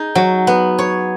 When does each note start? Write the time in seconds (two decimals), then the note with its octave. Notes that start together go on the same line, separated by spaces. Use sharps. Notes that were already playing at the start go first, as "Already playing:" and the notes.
Already playing: D#4 G#4
0.15 F#3
0.47 B3
0.79 C#5